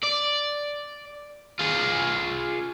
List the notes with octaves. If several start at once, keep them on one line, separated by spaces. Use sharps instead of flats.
D5
F4 G#4